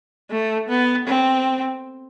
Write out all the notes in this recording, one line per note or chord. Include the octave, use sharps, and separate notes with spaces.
A3
B3
C4